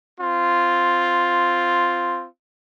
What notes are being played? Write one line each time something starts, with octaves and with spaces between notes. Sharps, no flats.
C4 F4